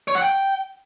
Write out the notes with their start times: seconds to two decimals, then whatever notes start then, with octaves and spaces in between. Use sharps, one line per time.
0.08 C#5
0.15 F#5
0.22 G5